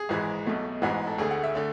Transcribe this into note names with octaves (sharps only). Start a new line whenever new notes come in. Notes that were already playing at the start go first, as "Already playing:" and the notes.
Already playing: G#4
G#1 G#2 E3 G#3
B1 B2 A3
A1 G#2 E3 G#3 F#4
A4
D2 D3 A3 G#4
F#5
E5
D3 A3